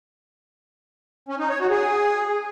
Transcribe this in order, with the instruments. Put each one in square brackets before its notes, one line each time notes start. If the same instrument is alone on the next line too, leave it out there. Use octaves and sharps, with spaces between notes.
[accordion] C#4
D#4
C#5
F#4
G#4